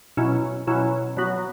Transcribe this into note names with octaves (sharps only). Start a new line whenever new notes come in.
B2 F#3 C#4 E4
B2 F#3 C#4 E4
F#3 B3 F#4